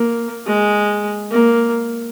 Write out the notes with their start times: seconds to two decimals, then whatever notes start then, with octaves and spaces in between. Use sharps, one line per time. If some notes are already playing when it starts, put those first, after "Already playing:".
Already playing: A#3
0.46 G#3
1.31 A#3